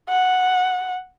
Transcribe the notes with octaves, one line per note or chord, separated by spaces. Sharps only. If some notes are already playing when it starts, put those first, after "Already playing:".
F#5